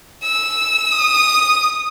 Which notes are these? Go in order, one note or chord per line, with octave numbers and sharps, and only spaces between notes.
E6
D#6